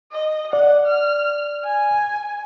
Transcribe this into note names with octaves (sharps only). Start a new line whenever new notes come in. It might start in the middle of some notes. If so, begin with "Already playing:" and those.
D#5
D5 F#5
F6
G#5